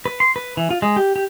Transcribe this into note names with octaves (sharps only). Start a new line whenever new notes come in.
B4
C6
B4
E3
F4
G#3
G4
G4